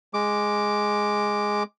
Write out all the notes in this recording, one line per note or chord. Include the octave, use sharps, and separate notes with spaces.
G#3 D6